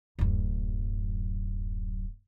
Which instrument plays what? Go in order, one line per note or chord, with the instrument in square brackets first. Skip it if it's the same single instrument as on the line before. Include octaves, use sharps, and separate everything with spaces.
[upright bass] D1 F#2